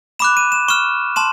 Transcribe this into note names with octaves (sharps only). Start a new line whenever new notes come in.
B5 D6 F#6 E7
D#7
E7
C#6 F6 E7
A5 C6 E7